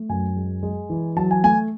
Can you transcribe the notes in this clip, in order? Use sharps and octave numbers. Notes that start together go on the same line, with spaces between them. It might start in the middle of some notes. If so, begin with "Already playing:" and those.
Already playing: A3
F#2 G#5
G#3
G#3
E3
F#3 A5
G#5
A3 G#5